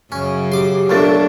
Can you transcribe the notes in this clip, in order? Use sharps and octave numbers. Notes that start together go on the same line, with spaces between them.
F#2 C#3 C#4
G4 C6 D6
B1 A3 A#3 D4 F4 A6